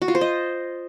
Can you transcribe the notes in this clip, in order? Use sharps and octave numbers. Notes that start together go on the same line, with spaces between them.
F#4
F4
C5
D#5